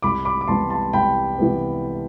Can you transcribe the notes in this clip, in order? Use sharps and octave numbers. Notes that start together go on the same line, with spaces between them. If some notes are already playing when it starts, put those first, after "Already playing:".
C2 B5 D6
B5 D6
D6
C3 E3 G3 B3 A5 C6
A5 C6
C2 G5 B5
C3 E3 G3 B3